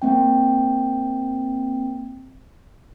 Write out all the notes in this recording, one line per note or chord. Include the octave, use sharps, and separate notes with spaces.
A#3 C4 G5